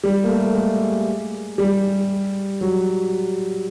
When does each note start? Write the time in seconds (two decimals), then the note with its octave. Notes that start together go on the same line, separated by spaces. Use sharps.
0.04 G3
0.24 A#3
0.29 A3
0.55 G#3
1.58 G3
2.61 F#3